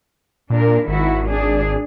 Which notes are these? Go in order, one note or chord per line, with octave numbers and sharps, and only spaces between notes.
A#2 D4 A#4
G#1 D#3 E4 F#4
D4 G#4